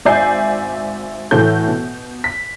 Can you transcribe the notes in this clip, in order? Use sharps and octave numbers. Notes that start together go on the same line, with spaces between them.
G#1 D5 E5 G#5 G6 C7
A2 E3 F#4 A4 G6
B2
B6